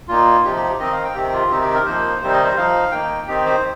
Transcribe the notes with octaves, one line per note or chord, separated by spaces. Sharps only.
A#2 A#3 D#4 F4
C3 F3 D#4 G4
G4
D#3 C4 D#4 D#5
F5
G5
C3 D#3 C4 G4
F4
C3 D#3 C4 D#4 G4
G4
A#4
F3 A#3 D#4 C5
C3 D#3 G3 C4 D#4 C5
D#5
C5
F3 D#4 F5
D#3 A#3 D#4 G5
D#3 C4 D#4 G4
C5